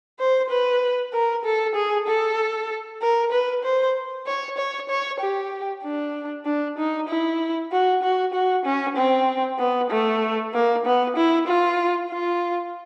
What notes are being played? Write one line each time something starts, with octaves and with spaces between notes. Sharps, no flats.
C5
B4
A#4
A4
G#4
A4
A#4
B4
C5
C#5
C#5
C#5
G4
D4
D4
D#4
E4
F#4
F#4
F#4
C#4
C4
B3
A3
A#3
B3
E4
F4
F4